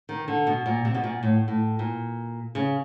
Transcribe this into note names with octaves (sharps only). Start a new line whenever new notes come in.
D#3
D3
B2
A#2
C3
B2
A#2
A2
A2
A#2
C#3